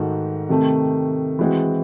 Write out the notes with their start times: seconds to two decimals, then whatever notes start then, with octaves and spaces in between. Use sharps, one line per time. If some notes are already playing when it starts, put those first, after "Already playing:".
Already playing: G#2 D#3 A3 D#4 F#4
0.49 C3 D#3 A3 C4
1.39 E3 G#3 C4 F#4